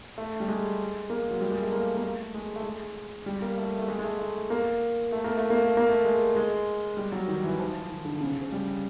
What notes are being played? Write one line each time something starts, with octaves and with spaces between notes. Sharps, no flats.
A3
G3
G#3
A#3
F#3
G3
G#3
A3
A#3
A#3
A3
G#3
A3
G#3
G3
A#3
A3
A3
G#3
G#3
A3
A3
A#3
A3
A#3
A3
A#3
A3
A#3
A3
G#3
G#3
G3
F#3
D#3
E3
F3
D#3
D3
C#3
C#3
F3
G3